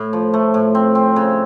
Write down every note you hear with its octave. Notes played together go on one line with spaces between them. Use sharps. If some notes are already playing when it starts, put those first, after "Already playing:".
Already playing: A2
F3
A3
A2
C4
C4
C#3